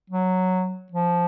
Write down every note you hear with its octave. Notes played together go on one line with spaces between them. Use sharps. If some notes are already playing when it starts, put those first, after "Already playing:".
F#3
F3